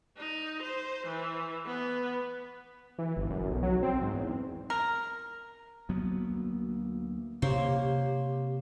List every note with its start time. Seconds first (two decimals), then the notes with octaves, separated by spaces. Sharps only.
0.18 D#4
0.62 C5
1.06 E3
1.66 B3
2.99 E3
3.17 G1
3.30 F#2
3.50 B1
3.63 F#3
3.83 C4
4.02 G#2
4.14 E2
4.70 A#4
5.89 D2 F#3 A#3 B3
7.42 C3 A#3 G4 C5 C#5